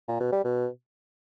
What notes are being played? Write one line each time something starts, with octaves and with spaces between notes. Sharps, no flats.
A#2
B2
G3
B2